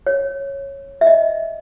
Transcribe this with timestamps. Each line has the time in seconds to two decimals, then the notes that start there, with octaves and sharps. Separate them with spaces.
0.07 C#5
1.01 E5
1.07 D#5